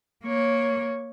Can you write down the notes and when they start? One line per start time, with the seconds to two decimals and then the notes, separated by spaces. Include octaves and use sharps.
0.25 A#3 C#5